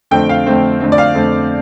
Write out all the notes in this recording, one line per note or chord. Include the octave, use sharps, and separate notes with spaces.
F2 D3 A3 C4 G5
F5
F2 D3 A3 C4
F2 D3 A3 C4
D5
F5
F2 D3 A3 C4